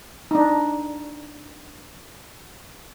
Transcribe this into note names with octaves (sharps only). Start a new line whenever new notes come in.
D4 D#4